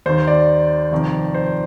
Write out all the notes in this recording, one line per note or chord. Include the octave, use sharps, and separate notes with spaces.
D#2 D#3 C5
D5
F1 F2 D#3
C5